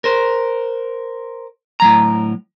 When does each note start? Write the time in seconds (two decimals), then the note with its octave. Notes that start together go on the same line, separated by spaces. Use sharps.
0.04 A#4 C5
1.80 A2 F#3 A#5